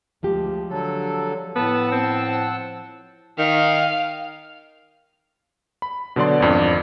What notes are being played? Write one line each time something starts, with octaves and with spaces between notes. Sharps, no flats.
D2 F3 G#3 G4
D3 F#3 A4
A2 B3 F#5 A5 E6
C4
D#3 F5
B5
B2 D3 F#3 D5 C6
G#1 F2 D4